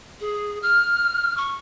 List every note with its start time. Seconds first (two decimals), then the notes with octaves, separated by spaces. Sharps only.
0.21 G#4
0.62 F6
1.37 C#6